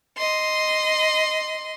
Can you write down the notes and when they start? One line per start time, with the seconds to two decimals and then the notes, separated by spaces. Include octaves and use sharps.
0.18 D#5 C6